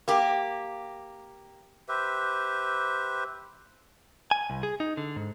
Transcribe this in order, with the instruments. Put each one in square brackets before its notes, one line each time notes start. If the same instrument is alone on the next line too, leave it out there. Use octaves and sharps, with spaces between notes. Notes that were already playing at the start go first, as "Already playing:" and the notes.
[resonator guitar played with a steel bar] A#3 G4
[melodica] G4 B4 C5 E5
[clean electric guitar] G#5
C2
G#4
D#4
D3
G#2